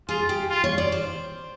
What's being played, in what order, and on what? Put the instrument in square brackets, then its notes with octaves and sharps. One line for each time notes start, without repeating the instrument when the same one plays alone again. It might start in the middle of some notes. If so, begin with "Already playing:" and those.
[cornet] F4 [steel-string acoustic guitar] G#4
[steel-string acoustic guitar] G4
[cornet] F4
[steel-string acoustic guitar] C#5
D5
C5